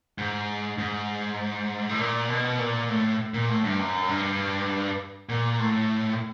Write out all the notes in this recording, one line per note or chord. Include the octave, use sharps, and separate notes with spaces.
G#2
G#2
A2
A#2
B2
A#2
A2
A#2
A2
G2
F#2
G2
A#2
A2